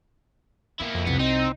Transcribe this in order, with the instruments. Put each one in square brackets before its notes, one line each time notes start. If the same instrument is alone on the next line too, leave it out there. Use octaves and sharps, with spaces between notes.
[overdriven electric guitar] A#3 E4 [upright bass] B3
[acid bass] F2
[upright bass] C2 C3 [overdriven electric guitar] B3
[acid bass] C4 [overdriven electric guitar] D#4